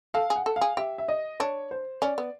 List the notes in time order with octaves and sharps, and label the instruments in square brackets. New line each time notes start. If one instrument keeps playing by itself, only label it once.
[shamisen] A4 [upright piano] F5
[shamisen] G#4
[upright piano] F#5
[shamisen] A4
[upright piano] F5
[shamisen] G#4
[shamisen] G4 [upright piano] E5
[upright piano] E5
D#5
[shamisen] D4 [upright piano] C#5
[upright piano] C5
[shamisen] C#4 [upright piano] D5
[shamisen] B3